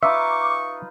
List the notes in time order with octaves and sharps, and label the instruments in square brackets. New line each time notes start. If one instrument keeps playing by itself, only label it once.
[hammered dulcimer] D#4 F4 B4 [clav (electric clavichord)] E5 [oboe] C#6 [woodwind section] D6